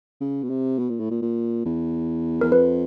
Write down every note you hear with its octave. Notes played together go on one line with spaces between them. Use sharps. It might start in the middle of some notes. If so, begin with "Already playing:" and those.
C#3
B2
C3
B2
A#2
A2
A#2
A#2
E2
E2 A#4
F2 B4